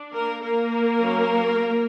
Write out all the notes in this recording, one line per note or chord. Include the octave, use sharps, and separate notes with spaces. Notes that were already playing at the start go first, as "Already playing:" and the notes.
Already playing: D4
A#3 A#4
A#3 A#4
F#3 C#4